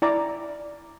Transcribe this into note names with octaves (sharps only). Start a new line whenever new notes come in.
E4 D5 A#5 D6